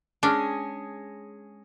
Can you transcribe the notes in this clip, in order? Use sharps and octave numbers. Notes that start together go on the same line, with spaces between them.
G#3 C#4 D4 G#4